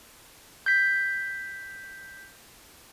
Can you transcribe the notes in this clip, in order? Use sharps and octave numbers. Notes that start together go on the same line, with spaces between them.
G6 B6